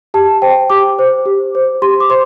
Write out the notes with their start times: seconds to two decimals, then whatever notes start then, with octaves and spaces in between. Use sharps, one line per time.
0.14 G4 A5
0.42 C5 G5
0.70 G4 D6
0.99 C5
1.26 G4
1.55 C5
1.82 G4 C6
2.00 D6
2.10 C5 C6